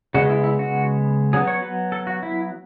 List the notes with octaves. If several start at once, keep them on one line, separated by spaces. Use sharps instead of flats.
C#3 G#3 B3 F#4
E4
E4
F#4
F#3 B3 G#4
C#5
B4
A4
F#4
E4